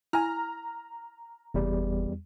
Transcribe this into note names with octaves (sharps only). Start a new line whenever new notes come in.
E4 G#5 A#5 F6
F#1 E2 G3